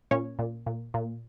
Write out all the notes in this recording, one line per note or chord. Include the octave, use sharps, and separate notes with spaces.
A#2 C#4 C#5
A#2
A#2
A#2